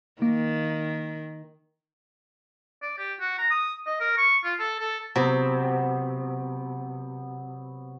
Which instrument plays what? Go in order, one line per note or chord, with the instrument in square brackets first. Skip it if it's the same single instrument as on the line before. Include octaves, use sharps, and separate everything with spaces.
[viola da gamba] D#3 [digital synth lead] A#3
[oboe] D5
G4
F#4
A#5
D#6
D#5
A#4
C#6
F4
A4
A4
[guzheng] C3 [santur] F#3 B3